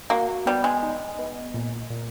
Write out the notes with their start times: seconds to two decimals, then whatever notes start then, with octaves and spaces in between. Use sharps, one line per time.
0.10 A#3 F#4
0.46 G3 B3
0.64 G#3
0.83 D#4
1.19 B3
1.54 A#2
1.90 A#2